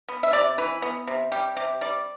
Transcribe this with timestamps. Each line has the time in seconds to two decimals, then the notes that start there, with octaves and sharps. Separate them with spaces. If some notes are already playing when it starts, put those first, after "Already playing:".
0.09 B3
0.23 E5
0.33 C3 D5
0.58 E3 B4
0.82 B3
1.07 C3
1.32 G3 G4
1.57 C3 G4
1.81 G3 D5